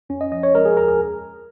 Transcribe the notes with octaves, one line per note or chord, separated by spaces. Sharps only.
F2 C#4
D#5
F3 D#5
C#5
G#3 A#4
G#4
D#2 A#4
G#4